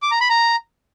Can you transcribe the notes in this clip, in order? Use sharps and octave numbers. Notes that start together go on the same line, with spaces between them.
D6
A#5
B5
A#5